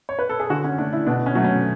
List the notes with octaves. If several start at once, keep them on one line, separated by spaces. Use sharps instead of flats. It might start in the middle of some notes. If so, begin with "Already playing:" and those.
C#5
B4
A4
G#4
D3 F#4
C#4
A3 D4
E4
B2 D4
C#4
F#3 A3
C#4